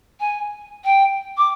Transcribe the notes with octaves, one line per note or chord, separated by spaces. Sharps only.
G#5
G5
D6